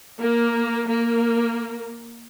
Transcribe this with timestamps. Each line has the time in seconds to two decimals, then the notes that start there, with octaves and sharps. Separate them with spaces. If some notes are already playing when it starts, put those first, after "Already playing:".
0.21 A#3
0.87 A#3